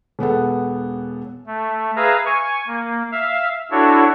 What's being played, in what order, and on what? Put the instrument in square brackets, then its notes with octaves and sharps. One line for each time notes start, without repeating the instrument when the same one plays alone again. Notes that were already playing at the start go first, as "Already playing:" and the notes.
[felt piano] E1 B3 A4 F#5
[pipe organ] A3
G#4 B4 E5 F5 A#5
G#5 C#6
A#3
E5 F5
D4 E4 F#4 A4 C#5